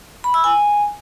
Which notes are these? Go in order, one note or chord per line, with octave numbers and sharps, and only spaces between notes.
B5
E6
G#5